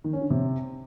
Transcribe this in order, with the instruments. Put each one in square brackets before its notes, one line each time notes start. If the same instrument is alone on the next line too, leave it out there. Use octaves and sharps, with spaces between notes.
[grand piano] D#3
C#4
D3
C3